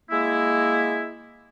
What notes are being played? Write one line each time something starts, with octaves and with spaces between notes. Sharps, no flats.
G#3 A#3 E4